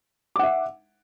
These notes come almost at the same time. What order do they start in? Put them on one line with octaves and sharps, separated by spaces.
D6 F#5 E5